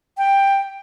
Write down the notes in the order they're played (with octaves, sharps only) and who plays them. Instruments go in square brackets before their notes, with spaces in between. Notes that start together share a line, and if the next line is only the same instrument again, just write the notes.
[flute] G5